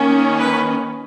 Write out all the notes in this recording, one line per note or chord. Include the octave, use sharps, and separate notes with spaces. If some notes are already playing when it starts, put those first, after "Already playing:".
Already playing: D#3 A#3 C#4
B4